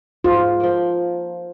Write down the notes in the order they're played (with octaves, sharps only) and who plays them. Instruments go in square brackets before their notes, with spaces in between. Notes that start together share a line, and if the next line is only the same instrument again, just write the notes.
[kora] G#2 [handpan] F4
[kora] F3 A#3